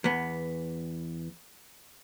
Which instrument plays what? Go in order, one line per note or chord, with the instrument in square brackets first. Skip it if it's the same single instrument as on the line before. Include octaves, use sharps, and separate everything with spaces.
[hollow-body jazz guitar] E2 B3